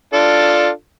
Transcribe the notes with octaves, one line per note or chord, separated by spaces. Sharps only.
D4 F4 A4